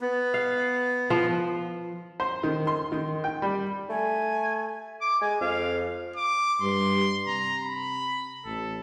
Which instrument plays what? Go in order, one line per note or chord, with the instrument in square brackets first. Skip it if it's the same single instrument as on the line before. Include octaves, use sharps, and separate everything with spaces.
[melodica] B3
[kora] F5
F3
[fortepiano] C5
D#3
C6
D#3
G5
G3
[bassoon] A3 [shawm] G#5
[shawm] D6
[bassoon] G#3 [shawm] G#5
[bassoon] F2 [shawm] F5
[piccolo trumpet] D6
[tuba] G2 [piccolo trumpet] C6
[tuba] C3 [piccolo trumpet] A#5
[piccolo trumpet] B5
[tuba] A1 [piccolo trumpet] A4